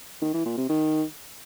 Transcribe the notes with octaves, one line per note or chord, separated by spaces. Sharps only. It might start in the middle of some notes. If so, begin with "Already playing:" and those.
D#3
E3
A#2
C3
D#3